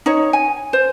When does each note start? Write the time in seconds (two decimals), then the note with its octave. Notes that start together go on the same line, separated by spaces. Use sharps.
0.06 D#4 C#5
0.33 G#5
0.73 C5